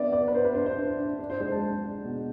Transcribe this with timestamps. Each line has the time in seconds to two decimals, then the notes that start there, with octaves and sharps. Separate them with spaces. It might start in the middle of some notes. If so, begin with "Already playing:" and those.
Already playing: B3 D4 D5 E5
0.12 B3 D5
0.28 B4
0.34 B3 C5
0.45 B4
0.55 D4 C5
0.66 C5
0.77 D4
0.98 D4
1.19 D4
1.30 C5
1.40 G#3 C5
1.51 A5
1.62 G#3
1.83 D4
2.04 B2